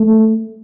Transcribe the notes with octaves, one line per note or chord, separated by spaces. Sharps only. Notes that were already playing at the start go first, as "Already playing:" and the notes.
Already playing: A3